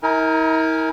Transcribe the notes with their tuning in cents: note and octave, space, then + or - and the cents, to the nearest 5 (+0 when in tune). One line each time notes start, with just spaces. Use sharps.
E4 -45 A#4 +0 G#5 +0